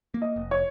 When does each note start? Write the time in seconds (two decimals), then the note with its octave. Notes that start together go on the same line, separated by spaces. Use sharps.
0.14 A#3
0.22 D#5
0.36 F1
0.51 C#5